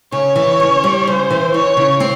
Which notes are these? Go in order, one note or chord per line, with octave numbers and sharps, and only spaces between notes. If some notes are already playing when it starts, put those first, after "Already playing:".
C#3 C#5
E3
C#3
G3
C#3 C5
E3
E3 C#5
C#3
C4